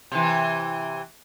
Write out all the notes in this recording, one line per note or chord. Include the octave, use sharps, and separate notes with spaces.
C3 E3